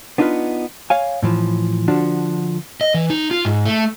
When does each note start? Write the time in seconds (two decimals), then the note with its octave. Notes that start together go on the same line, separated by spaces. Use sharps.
0.18 B3 D4 D#4 F4 G4 B4
0.90 C#5 F5 G#5
1.23 A2 E3 F3
1.88 D3 F3 D4 F#4
2.81 D#5
2.94 E3
3.10 D#4
3.31 F4
3.45 G#2
3.66 A3